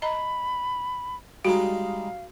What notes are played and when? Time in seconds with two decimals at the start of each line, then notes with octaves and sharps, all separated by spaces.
0.02 D#5 A#5 B5
1.45 G3 G#3 D#4 F#4 F5